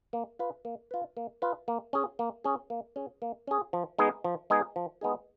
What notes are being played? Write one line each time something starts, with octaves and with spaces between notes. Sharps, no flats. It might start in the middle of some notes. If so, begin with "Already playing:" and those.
A#3
F4 B4
A#3
F4 B4
A#3
F4 B4
A#3
C#4 G#4
A#3
C#4 G#4
A#3
C#4 G#4
A#3
C#4 G#4
F3
G#3 B3 D#4 G#4
F3
G#3 B3 D#4 G#4
F3
G#3 B3 D#4 G#4